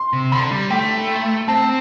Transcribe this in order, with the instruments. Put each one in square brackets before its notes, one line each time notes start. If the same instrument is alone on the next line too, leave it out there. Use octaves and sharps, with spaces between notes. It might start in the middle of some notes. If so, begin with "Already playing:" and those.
Already playing: [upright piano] C6
[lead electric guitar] C3
[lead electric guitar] D3 [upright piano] B5
[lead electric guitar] G3
[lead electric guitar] A3 [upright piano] G5
[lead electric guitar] C4 [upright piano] A5